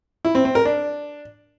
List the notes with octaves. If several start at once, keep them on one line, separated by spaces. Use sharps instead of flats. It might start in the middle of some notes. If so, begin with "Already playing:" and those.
E4
C4
C4
A#4
D4